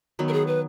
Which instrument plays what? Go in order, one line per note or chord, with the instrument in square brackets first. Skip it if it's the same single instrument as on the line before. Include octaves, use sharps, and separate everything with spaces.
[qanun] D#3 F#3 B3
[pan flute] A#4
G#4
B4